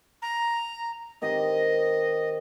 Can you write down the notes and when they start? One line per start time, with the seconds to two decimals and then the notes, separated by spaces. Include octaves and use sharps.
0.22 A#5
1.22 D#3 C4 G4 D#5